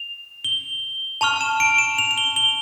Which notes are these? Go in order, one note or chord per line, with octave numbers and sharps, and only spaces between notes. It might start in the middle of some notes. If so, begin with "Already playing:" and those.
Already playing: F7
G7
A5 C#6 F6 F7
E7
D7
E7
F7
F7
G7
G7